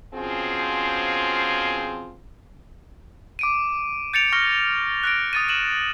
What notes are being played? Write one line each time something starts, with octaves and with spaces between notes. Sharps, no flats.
B2 F3 C4 C#4 F4 G#4
D6 D7 D#7
G6 A6 C#7 D7 F7
C#6 F6 A#6 G7
F#6 A#6 D7
D#6 A6 D#7
D#7 E7 F#7